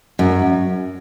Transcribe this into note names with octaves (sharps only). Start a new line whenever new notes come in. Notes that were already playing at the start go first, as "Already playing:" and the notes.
F#2